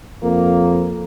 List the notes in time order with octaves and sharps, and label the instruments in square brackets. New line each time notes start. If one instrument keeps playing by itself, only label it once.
[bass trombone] F2 [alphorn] A#3